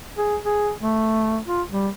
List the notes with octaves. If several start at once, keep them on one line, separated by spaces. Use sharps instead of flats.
G#4
G#4
A3
F4
G3